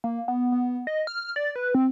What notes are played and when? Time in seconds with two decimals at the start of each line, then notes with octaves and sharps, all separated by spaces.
0.04 A#3
0.28 B3
0.52 B3
0.87 D#5
1.07 F6
1.36 D5
1.56 B4
1.75 C4